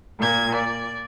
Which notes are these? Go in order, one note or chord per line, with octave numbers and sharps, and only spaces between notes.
A#2 G#6
D5